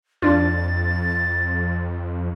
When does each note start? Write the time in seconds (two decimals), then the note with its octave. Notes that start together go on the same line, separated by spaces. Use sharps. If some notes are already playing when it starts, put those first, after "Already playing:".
0.22 F2 D4 F4 A6